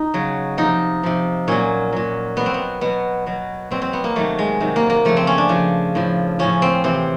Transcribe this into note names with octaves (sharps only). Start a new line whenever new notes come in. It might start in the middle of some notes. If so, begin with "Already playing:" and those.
Already playing: D#4
C#3 F#3
C3 F3 D#4
C3 F3
A#2 F#3 C#4
A#2 F#3
B2 F#3 B3
C4
B3
B2 F#3 B3
B2 F#3
B2 F#3 C4
C4
B3
A#3
C3 D#3 F#3 A3
G#3
C3 D#3 F#3
A#3
A#3
C#3 F3 A3
C4
C#4
D4
C#3 F3
A2 F3
A2 F3 C#4
C4
C3 E3 C4